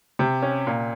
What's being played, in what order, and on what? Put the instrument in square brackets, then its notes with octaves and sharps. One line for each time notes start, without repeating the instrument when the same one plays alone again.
[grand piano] C3
C#4
A#2